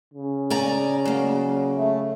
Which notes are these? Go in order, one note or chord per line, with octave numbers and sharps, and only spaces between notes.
C#3
D5 G#5 A#5
F#3 A#3
A3